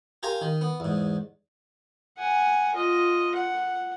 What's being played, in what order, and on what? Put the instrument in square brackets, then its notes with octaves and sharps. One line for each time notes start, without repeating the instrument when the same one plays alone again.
[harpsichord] G4 A#4 F5 G#5 A#5 C6
D#3
B3
E2 G#2
[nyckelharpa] F#5 G#5
F4 D#5
F#5